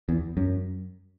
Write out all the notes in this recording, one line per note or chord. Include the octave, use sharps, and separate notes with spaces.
E2
F#2